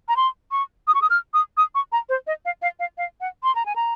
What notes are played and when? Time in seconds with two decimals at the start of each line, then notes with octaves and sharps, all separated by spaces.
0.09 A#5
0.17 C6
0.52 C#6
0.88 D#6
0.95 C#6
1.02 D#6
1.10 F6
1.34 D#6
1.57 D#6
1.75 C#6
1.92 A#5
2.09 C5
2.27 D#5
2.45 F5
2.62 F5
2.80 F5
2.98 F5
3.21 F#5
3.43 C6
3.55 A#5
3.66 G#5
3.76 A#5